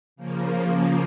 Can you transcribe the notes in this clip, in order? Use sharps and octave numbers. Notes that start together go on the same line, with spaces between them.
C#3 F3 A#3